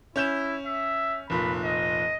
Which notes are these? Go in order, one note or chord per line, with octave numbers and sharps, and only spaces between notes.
C#4 E4 G6 E7
E5
F1 A#2 B5
D#5